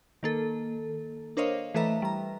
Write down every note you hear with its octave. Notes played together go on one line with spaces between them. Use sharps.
D#3 A#3 A4
D4 A#4 C5 C#5 D#5 F5
E3 A3 A4 B4 E5 A#5
G3 A#5